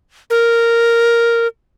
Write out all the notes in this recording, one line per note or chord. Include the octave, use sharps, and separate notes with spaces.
A#4